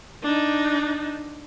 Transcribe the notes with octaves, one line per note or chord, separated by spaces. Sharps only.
D4 D#4